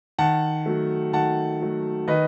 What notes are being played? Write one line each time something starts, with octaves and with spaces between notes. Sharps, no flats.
D#3 F#5 A5
F#3 A3
D#3 F#5 A5
F#3 A3
D#3 B4 D#5